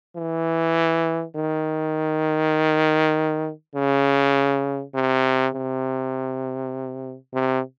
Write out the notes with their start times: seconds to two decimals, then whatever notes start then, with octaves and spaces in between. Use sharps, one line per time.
0.17 E3
1.36 D#3
3.75 C#3
4.95 C3
5.54 C3
7.34 C3